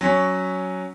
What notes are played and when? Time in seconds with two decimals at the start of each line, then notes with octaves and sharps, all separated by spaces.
0.01 F#3 C#4 B6